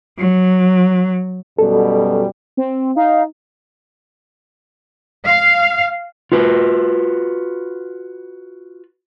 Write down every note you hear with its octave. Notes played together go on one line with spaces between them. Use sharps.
F#3
F#2 B2 G3 A4
C4
D#4 F5
F5
F4 F#4 B4